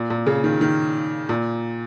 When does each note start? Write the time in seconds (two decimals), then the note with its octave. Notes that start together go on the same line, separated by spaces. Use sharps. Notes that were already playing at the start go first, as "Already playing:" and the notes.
Already playing: A#2
0.10 A#2
0.27 C#3
0.44 D#3
0.61 D#3
1.29 A#2